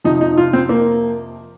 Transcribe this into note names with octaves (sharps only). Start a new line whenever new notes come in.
F2 C3 F3 D#4
D#4
F4
C4
A#3